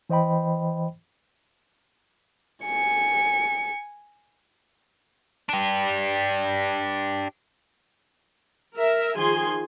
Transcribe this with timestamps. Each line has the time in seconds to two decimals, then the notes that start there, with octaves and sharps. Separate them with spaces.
0.09 E3 C5 D#5 G5 B5
2.65 G#5 C#7
5.49 D4 G4
8.76 A#4 E5
9.16 D#3 F3 G#4 G#5 C6